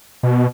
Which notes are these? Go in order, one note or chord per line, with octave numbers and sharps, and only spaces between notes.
B2